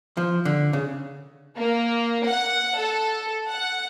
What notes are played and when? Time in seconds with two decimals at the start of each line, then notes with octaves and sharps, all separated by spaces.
0.17 F3
0.45 D3
0.73 C#3
1.57 A#3
2.26 F#5
2.78 A4
3.49 F#5